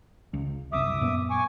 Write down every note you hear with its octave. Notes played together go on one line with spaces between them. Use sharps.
C#2
F#1 C2 E5 D6 D#6
F#2 A#2 B3
G#5 C#6 D6